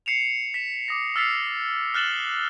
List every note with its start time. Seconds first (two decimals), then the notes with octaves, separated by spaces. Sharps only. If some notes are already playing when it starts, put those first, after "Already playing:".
0.06 C7 C#7 E7 F7
0.54 B6 E7
0.88 D6 D#6 A#6
1.16 E6 F6 A6 B6 C7 F7
1.94 F6 F#6 A6 E7 F#7 G7